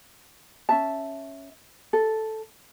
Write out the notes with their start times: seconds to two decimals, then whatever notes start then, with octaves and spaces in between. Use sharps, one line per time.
0.69 C#4 E5 A5
1.93 A4